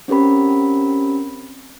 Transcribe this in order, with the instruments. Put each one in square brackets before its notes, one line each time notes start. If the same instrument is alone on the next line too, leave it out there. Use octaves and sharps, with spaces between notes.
[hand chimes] C4 C#4 G4 A#4 B5